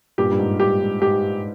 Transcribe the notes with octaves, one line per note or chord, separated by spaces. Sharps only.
G2 A#2 G4
G2
G#2
G2 G4
G#2
G#2 G4